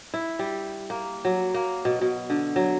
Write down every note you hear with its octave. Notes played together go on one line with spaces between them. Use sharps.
E4
G3
A#3
F#3
A#3
B2
B2
D3
F#3